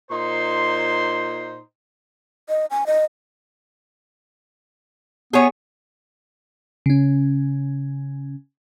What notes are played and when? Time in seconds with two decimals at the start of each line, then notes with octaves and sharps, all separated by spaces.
0.11 A#2 D#4 C5 C6
2.49 D#5
2.71 G#5
2.87 D#5
5.33 B3 G#4 C#5
6.86 C#3 C#4